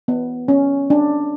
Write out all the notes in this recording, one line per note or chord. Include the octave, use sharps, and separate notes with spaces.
B3
C#4
D4